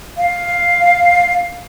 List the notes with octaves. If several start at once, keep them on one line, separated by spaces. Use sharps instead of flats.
F5